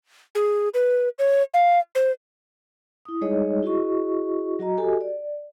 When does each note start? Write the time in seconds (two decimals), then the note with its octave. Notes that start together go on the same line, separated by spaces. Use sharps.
0.35 G#4
0.74 B4
1.19 C#5
1.54 F5
1.95 C5
3.05 E4 D#6
3.21 G3 G#3 D#4 G#4 C#5 D#5
3.63 E4 F#4 G#4 D#5 C#6
4.59 F#3 F#4 D#5 A#5
4.78 F#4 G4 A4 D#5 G#5
5.01 D5